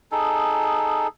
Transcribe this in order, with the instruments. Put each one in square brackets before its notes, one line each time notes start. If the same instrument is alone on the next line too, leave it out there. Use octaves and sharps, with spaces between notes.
[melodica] D#4 G#4 A4